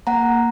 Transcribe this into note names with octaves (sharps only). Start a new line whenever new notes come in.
A#3 F#5 A#5